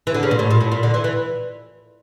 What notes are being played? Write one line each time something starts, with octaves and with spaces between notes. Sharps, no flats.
E3
D3
C#3
A#2
A2
A#2
A2
A#2
D3
E3
E3